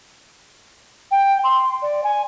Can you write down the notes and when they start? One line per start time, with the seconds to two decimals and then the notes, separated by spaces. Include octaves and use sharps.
1.11 G5
1.43 C6
1.82 D5
2.04 G#5